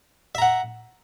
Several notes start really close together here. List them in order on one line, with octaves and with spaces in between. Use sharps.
E5 A#5 F#5